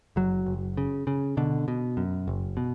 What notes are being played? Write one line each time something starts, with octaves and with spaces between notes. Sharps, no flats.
F#1 F#3
F#1
C#3
C#3
B2 D3
B2
F#2
F#1
B2